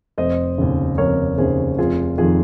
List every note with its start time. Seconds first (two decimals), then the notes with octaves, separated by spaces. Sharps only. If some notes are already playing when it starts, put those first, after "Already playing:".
0.18 F1 C5 D#5
0.58 D#2 C#3
0.98 F1 A#4 C#5
1.38 D#2 C#3 G#4 C5
1.78 F1 F4 G#4
2.18 F2 D#3 F4 G#4